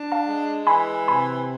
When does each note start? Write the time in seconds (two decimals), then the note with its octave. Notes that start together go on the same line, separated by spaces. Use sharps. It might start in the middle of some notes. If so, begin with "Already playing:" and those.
Already playing: D4
0.12 F5 A5
0.26 G#3
0.67 E3 G#5 B5
1.08 C3 G#5 B5